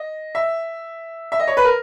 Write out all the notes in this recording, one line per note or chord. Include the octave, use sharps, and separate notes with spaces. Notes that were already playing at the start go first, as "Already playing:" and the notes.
Already playing: D#5
E5
E5
D#5
C#5
B4
A#4